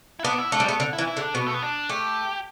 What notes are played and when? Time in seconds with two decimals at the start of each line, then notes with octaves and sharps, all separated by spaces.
0.19 E4
0.24 B3 D4
0.38 E4
0.52 A3 D4
0.60 G3
0.66 A3 B3
0.80 D3
0.93 E4
0.98 E3
1.07 E4
1.17 D3
1.21 D4
1.34 B2 B3
1.46 A3
1.54 B3
1.63 D4
1.89 A3 G4